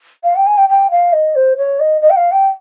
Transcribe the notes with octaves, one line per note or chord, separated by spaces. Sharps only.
F5
G5
G#5
G5
G5
F5
D#5
C5
C#5
D#5
D#5
G5
F5
G5